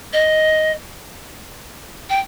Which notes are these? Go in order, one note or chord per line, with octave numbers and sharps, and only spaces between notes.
D#5
G5